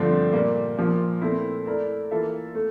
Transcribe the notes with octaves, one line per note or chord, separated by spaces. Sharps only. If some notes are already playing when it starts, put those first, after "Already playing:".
Already playing: G2 D3 F3 A3 C4
A#2 G3 A#3
A#2 F3 A#3
A#2 A3 C4 E4
A3 E4 A#4 D5
E3 A#3 F4 A4 E5
A3